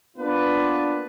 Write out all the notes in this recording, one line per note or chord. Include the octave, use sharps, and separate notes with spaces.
A#3 B3 D4 F4 B4